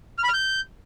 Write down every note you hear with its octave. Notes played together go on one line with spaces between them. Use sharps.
F6
B5
F6
G6